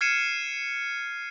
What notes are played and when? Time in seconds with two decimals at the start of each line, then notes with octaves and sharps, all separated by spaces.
0.01 F6 G#6 C7 C#7 D#7 E7